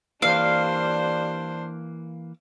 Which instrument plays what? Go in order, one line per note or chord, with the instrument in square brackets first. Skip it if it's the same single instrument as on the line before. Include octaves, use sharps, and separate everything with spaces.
[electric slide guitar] E3 A#3 [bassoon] G3 [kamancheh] D4 C5 [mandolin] F5